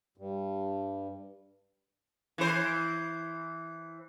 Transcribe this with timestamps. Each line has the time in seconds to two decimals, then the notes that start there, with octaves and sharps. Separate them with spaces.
0.17 G2
2.38 E3 C5